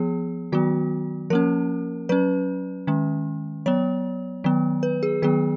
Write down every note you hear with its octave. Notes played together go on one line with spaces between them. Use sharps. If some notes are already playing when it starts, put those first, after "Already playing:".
Already playing: F3 B3 G#4
D#3 F#3 B3 F#4
F3 A#3 C#4 A#4
F#3 C#4 B4
D#3 G#3 C#4
F#3 B3 C#5
D#3 F#3 B3
B4
G#4
D#3 F#3 B3 G#4